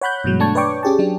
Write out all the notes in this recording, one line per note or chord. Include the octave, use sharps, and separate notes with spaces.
C#5 F#5 B5 F#6 G6
G2 B2 E3 F#3 G#3
A3 D4 A5 C#6 G#6
B4 C#5 D5 G5 C#6 D6
C#4 G4 G#4 G5 A5
F#3 D4